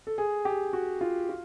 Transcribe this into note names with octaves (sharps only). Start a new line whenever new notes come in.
A4
G#4
G4
F#4
F4
F4